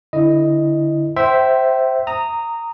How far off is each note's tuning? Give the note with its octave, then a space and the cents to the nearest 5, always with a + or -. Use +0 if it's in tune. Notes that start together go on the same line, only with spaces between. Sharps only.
D3 +0 E4 +0 D#5 +0
C5 +0 E5 +0 G5 -25
A#5 -15 D#6 +0